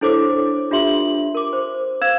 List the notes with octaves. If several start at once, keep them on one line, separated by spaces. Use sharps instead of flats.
D4 E4 A4 C5 C#5 D6
D4 F4 G4 E5 C6 F#7
A#4 D6
C5
C5 F5 E6 G#6 E7